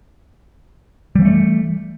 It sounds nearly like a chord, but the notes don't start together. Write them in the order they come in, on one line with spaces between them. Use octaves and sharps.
G3 E3 A#3 A3